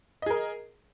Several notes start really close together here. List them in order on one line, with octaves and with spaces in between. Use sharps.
D#5 G#4 A#4